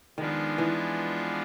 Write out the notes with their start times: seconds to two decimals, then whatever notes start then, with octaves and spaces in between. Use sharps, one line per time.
0.18 D#3 F3 G#3 B3 D4 F4
0.58 E3